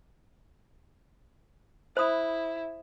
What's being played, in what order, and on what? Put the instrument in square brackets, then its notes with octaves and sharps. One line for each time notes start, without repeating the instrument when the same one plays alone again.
[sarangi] E4 [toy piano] C5 B5 D#6